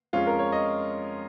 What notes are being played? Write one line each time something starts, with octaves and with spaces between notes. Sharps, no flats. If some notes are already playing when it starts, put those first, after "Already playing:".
F2 F3 G#3 C#4 F4
A#4
C#5
D#5